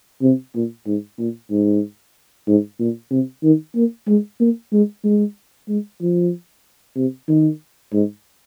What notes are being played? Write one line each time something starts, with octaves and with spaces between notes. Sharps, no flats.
C3
A#2
G#2
A#2
G#2
G#2
A#2
C3
D#3
A#3
G#3
A#3
G#3
G#3
G#3
F3
C3
D#3
G#2